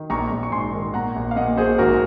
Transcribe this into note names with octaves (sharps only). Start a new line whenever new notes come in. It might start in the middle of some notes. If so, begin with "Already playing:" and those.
Already playing: D#3
A#1 A#5 C#6
A#1
C#6
G#2 G#5 C6
D#3
A#2 F#5 A#5
A#1
F5
A#2 D#5 F#5
A#1 G#4 C5
G#1 F#4 A#4